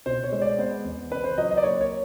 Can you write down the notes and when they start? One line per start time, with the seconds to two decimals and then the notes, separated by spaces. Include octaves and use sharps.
0.06 B2 C5
0.24 C#5
0.32 G#3
0.42 D5
0.58 B3 C5
0.85 E2
1.11 C#3 B4
1.24 C5
1.38 F#3 D#5
1.51 D#5
1.57 D5
1.63 A#3 C#5
1.81 C#5